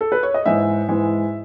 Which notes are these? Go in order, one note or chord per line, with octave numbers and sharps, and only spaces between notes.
A4
B4
C#5
D#5
G#2 E3 G#3 E5
G#2 E3 G#3